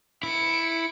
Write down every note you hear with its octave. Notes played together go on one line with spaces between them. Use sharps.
E4 C#7 D7